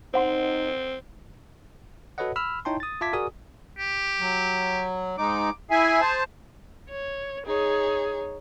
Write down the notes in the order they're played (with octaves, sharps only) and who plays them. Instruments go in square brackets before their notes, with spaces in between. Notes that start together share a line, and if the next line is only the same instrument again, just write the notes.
[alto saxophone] C4 [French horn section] D#4 [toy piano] C5 F#5 C6
[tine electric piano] F#4 A4 B4 C#5 D#5 F#5
B5 E6 F6
D#4 E4 C#5 G5 A5 C6
D#6 A6
F4 E5 A5 D6 G#6 B6
F#4 G#4 A#4 D5 G#5 D#6
[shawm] G4
[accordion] F#3
[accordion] G#2 G#3 D#4 [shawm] D6
[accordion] E4 E5 G#5 [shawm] G#4
[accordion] C5 A5
[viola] C#5
[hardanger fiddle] D#4 C#5 [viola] G#4